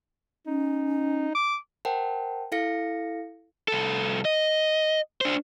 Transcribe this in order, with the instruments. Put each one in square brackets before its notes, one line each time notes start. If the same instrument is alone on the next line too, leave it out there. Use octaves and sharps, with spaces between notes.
[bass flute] C#4 [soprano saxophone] D#4
[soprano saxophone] D6
[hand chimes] A#4 C5 F#5 G5 A5
E4 A4 F5 A#6 C#7
[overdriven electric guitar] C2 A4
D#5
D4 C5